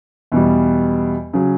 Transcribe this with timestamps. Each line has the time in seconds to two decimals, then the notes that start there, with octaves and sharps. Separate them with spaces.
0.32 E2 B2 G3
1.34 C#3 F#3